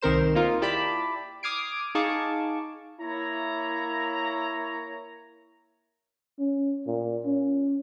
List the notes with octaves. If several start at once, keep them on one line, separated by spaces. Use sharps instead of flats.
C2 D#3 C4 A#4 C5 E7
A#3 D#4 F4 A#4
E4 G4 D5 A5 B5
D6 D#6 F6 G#6 C7 D7
D#4 G#4 F5 A5 C#6 D6
A#3 E4 C#5 A#5
C#4
A#2
C#4